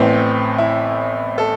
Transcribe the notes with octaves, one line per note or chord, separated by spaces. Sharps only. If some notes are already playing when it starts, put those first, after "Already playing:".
Already playing: A1 A2 E3 B3 C4
E4
A4